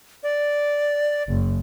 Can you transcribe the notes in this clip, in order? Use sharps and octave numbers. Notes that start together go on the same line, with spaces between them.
D5
F#1